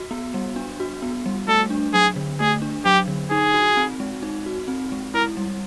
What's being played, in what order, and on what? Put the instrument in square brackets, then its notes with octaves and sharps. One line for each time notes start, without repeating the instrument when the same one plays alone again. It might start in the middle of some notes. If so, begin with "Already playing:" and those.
Already playing: [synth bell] F#4
B3
G3
D4
F#4
B3
G3
[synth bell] A3 [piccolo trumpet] A4
[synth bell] D4
[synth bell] F#3 [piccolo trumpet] G#4
[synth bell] D3
[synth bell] A3 [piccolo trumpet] G#4
[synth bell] D4
[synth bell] F#3 [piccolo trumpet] G4
[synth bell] D3
[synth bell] D#4 [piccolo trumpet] G#4
[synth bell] F#4
C4
G#3
D#4
F#4
C4
G#3
[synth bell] E4 [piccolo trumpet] A#4
[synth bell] G3